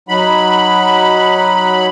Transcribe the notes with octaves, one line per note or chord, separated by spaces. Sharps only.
F#3 D#4 F#5 B5